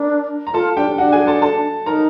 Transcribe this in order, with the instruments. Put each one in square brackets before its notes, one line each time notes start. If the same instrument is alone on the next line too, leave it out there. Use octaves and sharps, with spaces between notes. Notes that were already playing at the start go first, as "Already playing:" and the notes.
Already playing: [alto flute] D4 [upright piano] A#4
[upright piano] A#5
[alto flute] F4 [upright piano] A4 A5
[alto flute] D4 [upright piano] G4 G5
[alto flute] D4 [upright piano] F#4 F#5
[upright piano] G#4 G#5
A4 A5
A4 A5
[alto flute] D#4 [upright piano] A#4 A#5